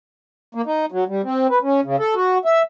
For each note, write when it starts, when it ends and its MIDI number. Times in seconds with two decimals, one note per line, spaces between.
0.55 0.62 58
0.66 0.86 63
0.92 1.04 54
1.08 1.21 55
1.23 1.47 60
1.50 1.59 71
1.63 1.80 61
1.84 1.96 49
1.99 2.14 69
2.15 2.38 66
2.45 2.62 76